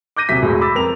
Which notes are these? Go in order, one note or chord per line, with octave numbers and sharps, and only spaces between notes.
D6 F#6 G6 A#6 D#7
D#1 C3 F#3 E5 B6
E1 A2 F#3 G#3
B5 D6 E6 A6
F2 A#4 F7